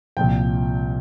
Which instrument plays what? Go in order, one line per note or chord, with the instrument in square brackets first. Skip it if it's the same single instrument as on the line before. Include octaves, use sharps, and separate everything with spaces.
[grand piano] C2 A#2 F3 G5